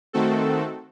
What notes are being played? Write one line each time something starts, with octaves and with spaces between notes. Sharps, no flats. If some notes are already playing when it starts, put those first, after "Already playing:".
D#3 A3 C4 F#4 A4